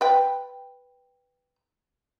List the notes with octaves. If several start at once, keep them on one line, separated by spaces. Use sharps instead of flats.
B4 G5